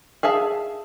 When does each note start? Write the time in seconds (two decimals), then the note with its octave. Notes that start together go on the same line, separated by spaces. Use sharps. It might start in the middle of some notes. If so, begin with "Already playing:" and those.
0.23 G#4 E5 F5 A5